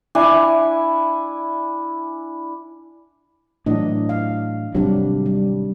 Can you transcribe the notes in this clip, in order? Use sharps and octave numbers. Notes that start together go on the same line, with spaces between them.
D4 E4 G#5
A2 E3 F#3 D4 D#5
F5
G#1 C3 F#3 G3 D4
G3